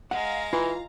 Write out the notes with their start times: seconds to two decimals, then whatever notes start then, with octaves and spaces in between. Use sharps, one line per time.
0.11 G#3 F5 F#5 A#5
0.53 E3 F4